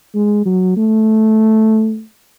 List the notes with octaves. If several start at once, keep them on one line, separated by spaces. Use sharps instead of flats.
G#3
F#3
A3